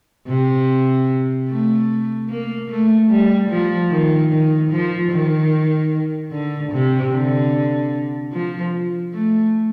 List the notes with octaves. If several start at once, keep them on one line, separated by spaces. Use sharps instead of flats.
C3
A3
A#3
A3
G3
F3
D#3
D#3
F3
D#3
D3
C3
D3
F3
A3